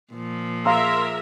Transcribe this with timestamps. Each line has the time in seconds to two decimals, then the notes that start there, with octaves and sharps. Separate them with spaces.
0.13 A#2 F3
0.65 G#4 A#4 E5 F5 A#5 C6 E6